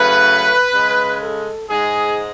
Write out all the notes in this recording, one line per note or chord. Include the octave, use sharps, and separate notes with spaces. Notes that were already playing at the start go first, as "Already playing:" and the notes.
Already playing: C#3 F#3 A3 B4
C#3 G#3
A4
G#2 G#3 G#4